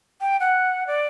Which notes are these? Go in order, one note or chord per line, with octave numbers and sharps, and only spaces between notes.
G5
F#5
D5